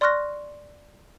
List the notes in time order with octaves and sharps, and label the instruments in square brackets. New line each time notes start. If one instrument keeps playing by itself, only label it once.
[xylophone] D5 C6 C#6 F6 F#6 A#6